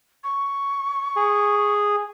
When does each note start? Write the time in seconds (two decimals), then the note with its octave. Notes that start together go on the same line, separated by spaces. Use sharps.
0.24 C#6
1.16 G#4